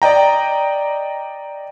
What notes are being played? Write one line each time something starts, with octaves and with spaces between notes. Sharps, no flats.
D5 D#5 G5 A#5